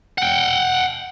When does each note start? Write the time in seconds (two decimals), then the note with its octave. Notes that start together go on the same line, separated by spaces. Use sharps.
0.18 F#5 G5